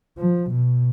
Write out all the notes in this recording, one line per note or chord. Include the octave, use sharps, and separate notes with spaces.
F3
B2